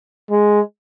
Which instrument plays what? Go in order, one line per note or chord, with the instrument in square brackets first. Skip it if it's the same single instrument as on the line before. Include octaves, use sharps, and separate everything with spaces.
[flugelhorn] G#3